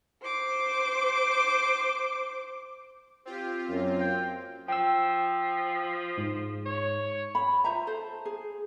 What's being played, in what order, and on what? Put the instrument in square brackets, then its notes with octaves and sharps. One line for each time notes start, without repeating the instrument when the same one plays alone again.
[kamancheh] C5 D6
[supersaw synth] C4 F4 [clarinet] G4
[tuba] F#2 [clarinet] A#3
[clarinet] G5
[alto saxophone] F3 [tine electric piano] G5 E6
[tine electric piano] G#2
[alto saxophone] C#5
[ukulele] B5
F4 C5 E5 A#5
A4 C5
G#4